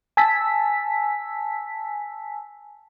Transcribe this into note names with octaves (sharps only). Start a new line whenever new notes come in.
G#5 A5 E6 B6